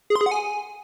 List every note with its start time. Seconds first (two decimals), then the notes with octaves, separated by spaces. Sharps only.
0.10 G#4
0.16 C6
0.21 G#4
0.26 F#5
0.32 G#5